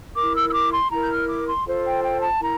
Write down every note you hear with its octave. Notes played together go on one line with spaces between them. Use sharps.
E4 A#4 D6
E6
E6
D6
C6
E4 A#4 A#5
G6
F6
D6
C6
F4 A4 C5
G5
G5
A5
E4 A#4 A#5